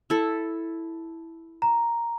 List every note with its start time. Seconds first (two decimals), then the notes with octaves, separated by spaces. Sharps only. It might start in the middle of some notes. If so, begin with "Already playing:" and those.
0.10 E4 A4
1.62 A#5